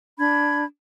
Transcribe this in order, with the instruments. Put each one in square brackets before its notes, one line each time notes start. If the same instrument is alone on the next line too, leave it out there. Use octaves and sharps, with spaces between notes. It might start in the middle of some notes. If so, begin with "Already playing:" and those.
[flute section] D4 B5 G#6